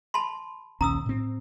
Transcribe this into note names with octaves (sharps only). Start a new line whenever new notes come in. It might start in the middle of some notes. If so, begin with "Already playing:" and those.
A5 B5 C6
A#1 D#2 C#4 A#5 D#6 E6
A2 C4